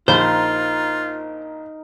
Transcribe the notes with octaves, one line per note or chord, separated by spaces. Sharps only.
A#1 D#4 F4 A#4 C5